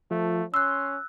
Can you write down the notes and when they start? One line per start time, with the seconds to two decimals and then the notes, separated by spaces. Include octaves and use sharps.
0.11 F3 A3
0.54 C#4 C6 E6 F#6